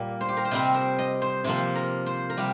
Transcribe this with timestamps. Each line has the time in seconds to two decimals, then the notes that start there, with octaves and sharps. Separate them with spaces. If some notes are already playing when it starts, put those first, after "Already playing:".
Already playing: A#2 G3 A#3 A#4
0.21 C5
0.28 G4
0.37 A#4
0.45 C5
0.51 C3 G3 C4 D#5
0.74 C5
0.99 D#5
1.22 C5
1.44 C3 F3 A#3 C5
1.75 A#4
2.06 C5
2.30 A#4
2.37 C3 G3 G4